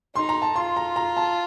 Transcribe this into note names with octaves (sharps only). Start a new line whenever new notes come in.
D#4 C6
A#5
A5
F4 C6
A#5
A#5
A5